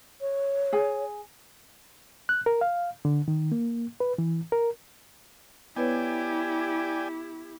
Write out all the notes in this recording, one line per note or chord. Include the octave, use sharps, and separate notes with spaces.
C#5
G#4 G#5
F#6
A#4
F5
D3
D#3
A#3
B4
E3
A#4
B3 E4 G4 B4 C#5 D5 G5 G#5